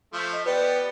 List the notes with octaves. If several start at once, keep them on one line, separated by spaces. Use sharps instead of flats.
F3 A3
D#5
B3 G4 B4 D5